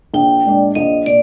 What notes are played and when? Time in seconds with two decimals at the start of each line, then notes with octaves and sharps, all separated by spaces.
0.14 A#1 G5
0.45 A#2 G#3 D4
0.75 A#1 D#5
1.06 A#2 D5